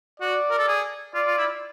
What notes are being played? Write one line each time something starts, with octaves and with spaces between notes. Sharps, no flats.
F#4 D5
A#4
A4
G#4
F4 D5
F4
E4